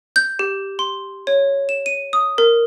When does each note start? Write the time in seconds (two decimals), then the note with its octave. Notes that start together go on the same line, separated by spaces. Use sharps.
0.16 G6
0.39 G4
0.79 C6
1.27 C#5
1.69 E7
1.86 D#7
2.13 D#6
2.38 A#4